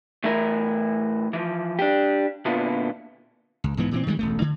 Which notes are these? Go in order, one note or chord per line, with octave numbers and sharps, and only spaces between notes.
A2 E3 E4 A#4
E3 F3
D4 G4
A#2 D3 B3 E4 F4
C#2
B1 G#2 E3 B3
A#2 E3 C4
D#3 E3 G3 G#3
E1 A1 A3
D3